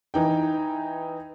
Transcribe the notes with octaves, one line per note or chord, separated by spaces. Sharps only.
E3 D#4 G5